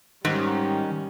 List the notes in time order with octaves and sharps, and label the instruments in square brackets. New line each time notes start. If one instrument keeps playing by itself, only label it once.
[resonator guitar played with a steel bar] G#2 [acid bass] D#3 [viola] G3 C#4